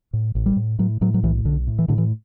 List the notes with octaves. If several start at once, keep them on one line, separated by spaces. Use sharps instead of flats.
A2
A1
G3
A2
A2 F#3
A2 F#3
F#3
B1 E3
B1 D3
A2
E3
A2 D3
E3